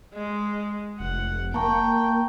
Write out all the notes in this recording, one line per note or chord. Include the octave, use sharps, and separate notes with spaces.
G#3
F1 F#5
A#3 G5 A5 A#5 C#6